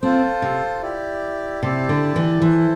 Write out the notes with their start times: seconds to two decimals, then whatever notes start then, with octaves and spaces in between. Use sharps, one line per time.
0.02 C4 F4 A4 C5
0.42 C3
0.82 E4 G4 D5
1.62 C3 E4 G4 D5 A5
1.89 D3
2.16 E3
2.42 E3 E4 A4 C5